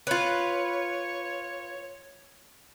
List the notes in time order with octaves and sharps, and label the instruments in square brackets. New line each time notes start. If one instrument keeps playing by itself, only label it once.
[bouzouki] F4 B4 [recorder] C#5